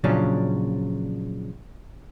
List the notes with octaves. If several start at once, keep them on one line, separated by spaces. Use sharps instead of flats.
A#2 C#3 F3 F#3 C#4 D4